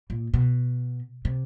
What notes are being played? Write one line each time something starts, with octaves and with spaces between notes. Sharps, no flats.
A#2
B2
C3